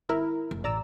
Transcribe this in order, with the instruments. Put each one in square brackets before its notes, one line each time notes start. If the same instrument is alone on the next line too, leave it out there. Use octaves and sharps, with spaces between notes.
[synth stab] G#1 E4 A#4
[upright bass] F1
[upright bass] A1 [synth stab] D5 A#5 E6